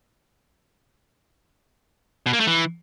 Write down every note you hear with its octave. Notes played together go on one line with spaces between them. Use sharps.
B2
A#3
A3
E3